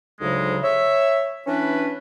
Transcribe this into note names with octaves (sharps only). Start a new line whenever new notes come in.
D2 G#2 C#3 F#3 G#3
C#5 E5
E3 C#4 D4 B4